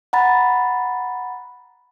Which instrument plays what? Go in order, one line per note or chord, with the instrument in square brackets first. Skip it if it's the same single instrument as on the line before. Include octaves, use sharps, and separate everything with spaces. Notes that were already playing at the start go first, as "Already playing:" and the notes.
[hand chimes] F#5 A#5 B5 A6